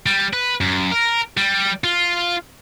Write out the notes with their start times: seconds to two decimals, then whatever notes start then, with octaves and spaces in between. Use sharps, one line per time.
0.06 G3
0.33 B4
0.61 F#2
0.92 A#4
1.37 G3
1.84 F4